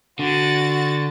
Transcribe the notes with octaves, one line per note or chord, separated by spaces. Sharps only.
D3 F#4 A6